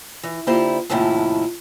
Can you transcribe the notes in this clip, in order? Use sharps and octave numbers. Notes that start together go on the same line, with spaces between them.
E3
D3 A#3 E4 F4 G4 C5
D#2 A2 C3 F3 C#4 E4